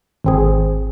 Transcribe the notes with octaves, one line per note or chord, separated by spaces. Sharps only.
G#1 C4 G#4